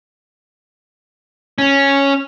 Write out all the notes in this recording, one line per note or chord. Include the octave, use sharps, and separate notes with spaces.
C#4